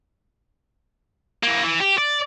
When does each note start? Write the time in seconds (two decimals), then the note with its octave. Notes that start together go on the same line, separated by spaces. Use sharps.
1.43 E3 A#3
1.62 E3
1.80 G4
1.98 D5